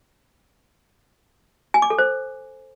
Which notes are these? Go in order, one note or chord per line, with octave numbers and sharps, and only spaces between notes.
G#5
D6
A4
C5